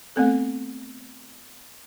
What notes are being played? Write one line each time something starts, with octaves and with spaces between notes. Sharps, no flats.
A3 B3 C4 A4